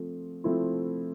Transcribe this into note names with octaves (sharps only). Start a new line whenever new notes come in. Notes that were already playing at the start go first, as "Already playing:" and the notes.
Already playing: F3 A3 C4
F3 A3 C4 E4